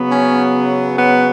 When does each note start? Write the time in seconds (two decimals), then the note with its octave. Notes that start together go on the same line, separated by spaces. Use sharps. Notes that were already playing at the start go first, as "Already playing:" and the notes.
Already playing: C#3 F#3 B3
0.09 C#4
0.98 B3